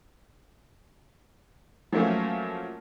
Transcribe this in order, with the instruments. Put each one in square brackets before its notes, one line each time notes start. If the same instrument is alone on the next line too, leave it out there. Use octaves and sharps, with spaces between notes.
[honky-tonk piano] F3 F#3 A3 A#3 C#4